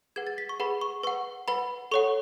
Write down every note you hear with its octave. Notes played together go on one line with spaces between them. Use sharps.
G#4 B4 F#5 G#6
A6
B6
C#6
G#4 B4 F#5 B5
C#6
B4 F#5 C#6
B4 F#5 B5
A4 C#5 F#5 C#6